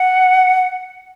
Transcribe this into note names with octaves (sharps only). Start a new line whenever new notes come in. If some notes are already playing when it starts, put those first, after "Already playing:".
Already playing: F#5